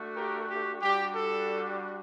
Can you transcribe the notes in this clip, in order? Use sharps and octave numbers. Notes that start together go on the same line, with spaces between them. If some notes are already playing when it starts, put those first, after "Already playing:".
Already playing: A3 D4 F#4
G4 A#4
G4
G3 D4 F#4 G4
A4